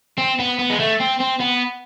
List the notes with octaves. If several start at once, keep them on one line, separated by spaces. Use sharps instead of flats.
C4
B3
B3
G#3
A3
C4
C4
B3